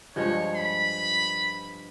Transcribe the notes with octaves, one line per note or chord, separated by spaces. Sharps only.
G2 F3 G#3 C#5
B5